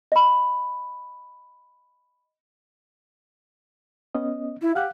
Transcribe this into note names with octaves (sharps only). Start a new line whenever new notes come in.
D#5 B5
B3 C#4 D#5
E4
G4 F5 F#5 F#6